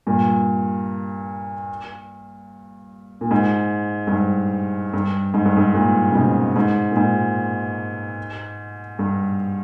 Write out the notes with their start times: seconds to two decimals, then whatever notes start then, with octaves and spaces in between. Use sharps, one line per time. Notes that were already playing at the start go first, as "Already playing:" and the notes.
0.07 G2 A#2
3.21 A#2
3.31 G#2
4.07 G2
4.12 G#2
4.93 G2
5.34 G#2
5.46 G2
5.57 G#2
5.74 G2 A#2
6.11 C#3
6.15 G#2 B2
6.56 G#2
6.91 A#2
6.96 G#2
8.99 G2